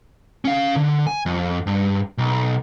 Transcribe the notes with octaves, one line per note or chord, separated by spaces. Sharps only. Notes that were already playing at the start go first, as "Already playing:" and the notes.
C#4 F5
D3
G#5
F2
G2
B1